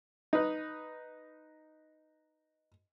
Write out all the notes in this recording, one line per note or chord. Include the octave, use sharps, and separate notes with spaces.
D#4 B4